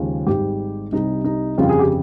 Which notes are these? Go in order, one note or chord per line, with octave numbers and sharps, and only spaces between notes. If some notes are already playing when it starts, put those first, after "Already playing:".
Already playing: D#2 C#3 F3 G#3
G#1 G#2 G3 G4
C2 C3 G3 D#4
D#4
G1 F2 C#3 G3 F4
G#4
G4